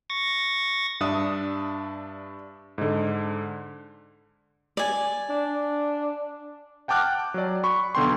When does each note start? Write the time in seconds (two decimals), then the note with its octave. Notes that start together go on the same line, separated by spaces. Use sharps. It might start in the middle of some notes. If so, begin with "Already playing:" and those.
0.10 C#6 A6 A#6
1.00 G2 D4 E5 D#6
2.78 G#2 D3
4.77 D5 G#5
5.30 D4
6.88 F#5 G5 A5 D6 F6 F#6
7.34 F#3 D5
7.63 B5 C#6
7.95 B1 D3 B3 G5 C6